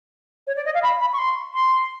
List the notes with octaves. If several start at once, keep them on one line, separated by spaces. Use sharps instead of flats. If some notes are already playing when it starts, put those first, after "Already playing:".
C#5
D5
D#5
F5
B5
B5
C#6
C6
C6